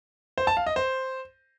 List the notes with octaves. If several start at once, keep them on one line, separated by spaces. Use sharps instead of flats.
C5
A5
F5
D#5
C5